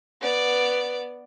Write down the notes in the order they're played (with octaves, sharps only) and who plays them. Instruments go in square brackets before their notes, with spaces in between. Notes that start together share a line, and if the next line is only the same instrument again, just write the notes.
[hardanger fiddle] B3 D5